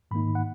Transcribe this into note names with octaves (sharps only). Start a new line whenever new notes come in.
G#2 D#3 A#3 D#4 B5
F#5